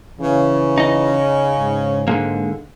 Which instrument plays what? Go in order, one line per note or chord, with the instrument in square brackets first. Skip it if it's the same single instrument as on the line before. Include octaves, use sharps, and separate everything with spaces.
[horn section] C#3 [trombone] E3
[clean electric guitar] D#4 D#5
[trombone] G#2
[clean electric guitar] D3 G#3 A#3